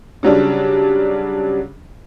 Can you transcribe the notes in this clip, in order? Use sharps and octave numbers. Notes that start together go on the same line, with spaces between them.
C#3 F#3 G3 D4